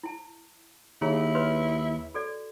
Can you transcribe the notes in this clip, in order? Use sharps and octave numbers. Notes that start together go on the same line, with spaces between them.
E4 A5
D#2 E4 G#4 C#5 A#5
B4 C#5 C6
F#4 A4 D5